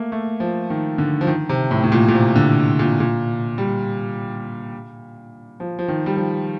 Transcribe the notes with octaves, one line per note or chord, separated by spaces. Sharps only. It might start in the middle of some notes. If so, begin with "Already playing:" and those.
Already playing: A3 A#3
A3
F3
D#3
D3
F3
D#3
C3
A2
A2
A#2
A#2
C3
D3
A#2
A#2
G3
F3
F3
D#3
G3
F3